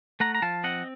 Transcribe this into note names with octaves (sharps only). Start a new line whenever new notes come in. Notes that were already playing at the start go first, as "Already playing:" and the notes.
A3 F#5 A#5
A#5
F3 F5 A5
C4 D#5 F#5